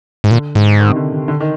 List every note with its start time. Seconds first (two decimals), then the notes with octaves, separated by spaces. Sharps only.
0.24 G#2
0.31 A#2 D3
0.55 G#2
0.79 D#3
0.88 C3
0.96 D3
1.12 C3
1.28 D3
1.40 D#3